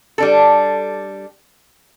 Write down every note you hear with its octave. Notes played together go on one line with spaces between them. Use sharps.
G3 D4 A4